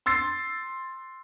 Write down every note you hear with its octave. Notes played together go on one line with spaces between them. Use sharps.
C6 E6 A6 C7